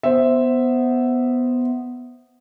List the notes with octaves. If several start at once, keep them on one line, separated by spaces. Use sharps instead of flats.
B3 C5 E5